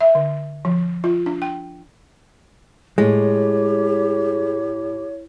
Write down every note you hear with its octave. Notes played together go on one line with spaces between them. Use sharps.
E5
D3
F3
F4
D4
G5
A2 G#3 G4 C#5